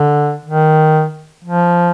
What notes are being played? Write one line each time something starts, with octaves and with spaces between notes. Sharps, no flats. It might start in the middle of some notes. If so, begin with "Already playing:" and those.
Already playing: D3
D#3
F3